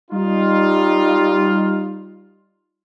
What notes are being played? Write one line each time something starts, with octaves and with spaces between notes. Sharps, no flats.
G3 D#4 F4